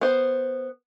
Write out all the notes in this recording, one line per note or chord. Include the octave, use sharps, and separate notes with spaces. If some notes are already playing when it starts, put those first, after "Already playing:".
B3 C5